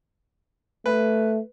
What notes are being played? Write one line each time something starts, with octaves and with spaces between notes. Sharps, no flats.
A3 B4